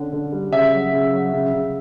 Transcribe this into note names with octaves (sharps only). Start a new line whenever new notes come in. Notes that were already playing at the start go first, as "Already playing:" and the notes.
Already playing: D3 C#4 D4
D3
G3
C#3 E5
F#3
C#3
F#3
C#3
C#3